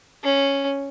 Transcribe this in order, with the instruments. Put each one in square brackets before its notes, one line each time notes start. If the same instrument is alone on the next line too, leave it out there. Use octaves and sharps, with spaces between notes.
[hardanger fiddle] C#4